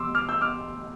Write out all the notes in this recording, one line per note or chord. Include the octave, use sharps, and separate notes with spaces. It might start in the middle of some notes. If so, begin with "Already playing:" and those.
Already playing: E2 B2 G3 C6 D6 E6
D6 F6
E6 G6
D6 F6